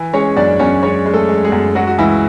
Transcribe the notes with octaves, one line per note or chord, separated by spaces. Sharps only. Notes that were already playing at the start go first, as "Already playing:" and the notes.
Already playing: E3
G#3 C#4 C#5
F#2 D4 D5
F#2 C#4 C#5
G#3 C#4 C#5
G#3
A3 A4
G#3
G#3 G#4
F#2
F#3 G#3 F#4
F#4
C#2 E3 E4